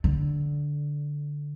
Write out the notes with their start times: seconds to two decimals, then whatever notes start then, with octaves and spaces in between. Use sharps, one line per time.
0.04 D3